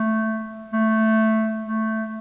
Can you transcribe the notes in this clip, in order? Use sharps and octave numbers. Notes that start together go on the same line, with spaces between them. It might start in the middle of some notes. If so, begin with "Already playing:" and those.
Already playing: A3
A3
A3